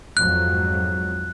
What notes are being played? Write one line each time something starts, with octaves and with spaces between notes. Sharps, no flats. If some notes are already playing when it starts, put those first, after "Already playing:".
F2 G#2 F#3 F#6